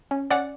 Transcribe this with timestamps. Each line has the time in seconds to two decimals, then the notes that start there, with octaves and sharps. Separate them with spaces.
0.11 C#4
0.30 C#4 D5 F#5